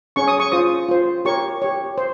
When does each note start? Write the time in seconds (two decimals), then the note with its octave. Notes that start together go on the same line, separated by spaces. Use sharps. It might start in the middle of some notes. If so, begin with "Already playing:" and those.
0.16 C#4 G#4 C#5 C#6
0.28 D#6
0.40 C#6
0.52 F4 C5 D#6
0.89 F4 C5
1.25 G4 A#4 C#5 C#6
1.62 G4 C#5
1.98 C5